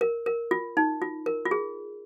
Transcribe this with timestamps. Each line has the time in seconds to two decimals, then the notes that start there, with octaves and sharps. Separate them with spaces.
0.01 A#4
0.26 A#4
0.51 F4
0.77 D#4
1.02 F4
1.26 A#4
1.45 F4
1.51 G#4